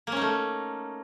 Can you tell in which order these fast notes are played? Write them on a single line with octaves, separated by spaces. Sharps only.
A#3 C#4 D#4 A3